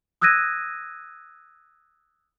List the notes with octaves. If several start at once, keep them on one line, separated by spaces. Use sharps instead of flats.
D#6 E6 F#6 G#6 A#6 D#7